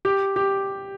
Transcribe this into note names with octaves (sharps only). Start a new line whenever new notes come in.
G4
G4